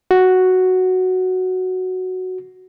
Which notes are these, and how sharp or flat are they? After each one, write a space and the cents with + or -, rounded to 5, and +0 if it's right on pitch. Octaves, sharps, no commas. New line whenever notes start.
F#4 +0